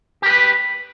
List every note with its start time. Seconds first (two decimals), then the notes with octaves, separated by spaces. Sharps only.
0.22 G4
0.26 A#4
0.30 B4